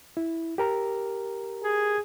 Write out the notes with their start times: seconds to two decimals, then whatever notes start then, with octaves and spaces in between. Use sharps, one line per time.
0.17 E4
0.58 G4 A#4 A#5
1.63 G#4